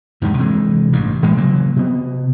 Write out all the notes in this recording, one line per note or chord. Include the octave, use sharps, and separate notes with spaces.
E2 G#2 C3 D#3
C3 E3 G#3
A1 G2
A2 E3 G#3 A#3
C#3 F3 F#3 A#3
C3 B3